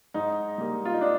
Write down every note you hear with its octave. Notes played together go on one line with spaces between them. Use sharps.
G#2 D#4
G3 A#3
F4
D#4
D4